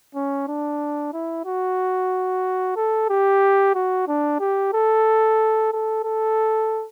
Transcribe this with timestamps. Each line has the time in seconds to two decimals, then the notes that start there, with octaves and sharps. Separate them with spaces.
0.15 C#4
0.48 D4
1.13 E4
1.46 F#4
2.76 A4
3.09 G4
3.75 F#4
4.08 D4
4.40 G4
4.73 A4
5.72 A4
6.04 A4